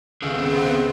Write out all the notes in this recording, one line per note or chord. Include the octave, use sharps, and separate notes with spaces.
C#2 B3 C4 G#4 A4 F5